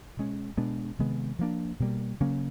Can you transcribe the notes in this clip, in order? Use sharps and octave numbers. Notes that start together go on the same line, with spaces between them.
B2 G#3 C#4
B2 G#3 B3 D4
C3 D#3 G#3 B3
F3 A#3 D4
B2 G3 A#3
C#3 F#3 A#3 C#4